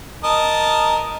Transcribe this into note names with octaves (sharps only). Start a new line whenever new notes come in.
A#4 D#5 A5